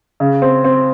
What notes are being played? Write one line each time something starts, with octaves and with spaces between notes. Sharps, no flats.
C#3
C4
C4